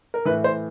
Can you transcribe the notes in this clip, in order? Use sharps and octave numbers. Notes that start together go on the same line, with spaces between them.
A#4
A2 E3 B4
C5